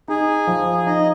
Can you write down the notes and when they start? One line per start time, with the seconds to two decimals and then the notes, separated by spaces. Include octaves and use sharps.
0.08 D#4 G#4
0.47 F3
0.87 D#4 D#5